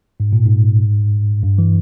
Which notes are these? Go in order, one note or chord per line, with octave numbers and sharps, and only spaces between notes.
G#2
A#2
G#2
G2
E3